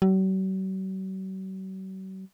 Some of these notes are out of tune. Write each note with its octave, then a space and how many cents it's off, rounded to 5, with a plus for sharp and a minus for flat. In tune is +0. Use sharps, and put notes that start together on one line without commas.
F#3 +45